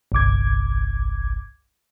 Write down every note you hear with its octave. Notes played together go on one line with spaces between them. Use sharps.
G1 C2 D6 G#6